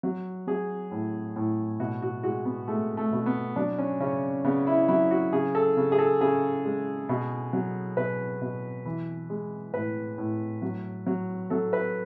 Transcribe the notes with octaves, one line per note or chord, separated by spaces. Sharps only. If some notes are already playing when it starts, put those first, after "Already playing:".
F#3
F#3 G#4
A2
A2
B2 F#4
F#4
G#3 F#4
B3
G#3 A3
A3
B2
B3
F#3 D4
C#4
C#3 C#4
C#3 B3
E4
F#3 E4
F#4
C#3 G#4
A4
C#3
G#4
A4
C#3 G#4
G#3
B2
F#3
B2 B4
B2
E3
G#3
A2 B4
A2
F#3
F#3
F#3 A4
B4